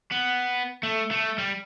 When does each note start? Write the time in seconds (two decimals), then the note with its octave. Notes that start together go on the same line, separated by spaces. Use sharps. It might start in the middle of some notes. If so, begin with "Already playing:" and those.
0.12 B3
0.83 A3
1.11 A3
1.38 G3